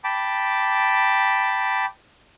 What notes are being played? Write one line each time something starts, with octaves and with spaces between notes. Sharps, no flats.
G5 A5 B5 D6